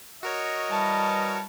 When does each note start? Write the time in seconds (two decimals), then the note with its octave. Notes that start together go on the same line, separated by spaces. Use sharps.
0.23 F#4 A#4 C#5 D#5
0.70 E3 G3 A5